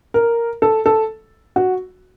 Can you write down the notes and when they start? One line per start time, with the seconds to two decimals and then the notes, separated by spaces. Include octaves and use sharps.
0.14 A#4
0.62 A4
0.86 A4
1.56 F#4